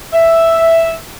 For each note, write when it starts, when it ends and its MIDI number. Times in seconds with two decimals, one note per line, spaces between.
0.13 0.95 76